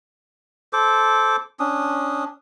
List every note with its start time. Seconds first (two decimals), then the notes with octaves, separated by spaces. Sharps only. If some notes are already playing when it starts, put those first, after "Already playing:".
0.73 A4 C5 D6
1.60 C#4 D4 D#6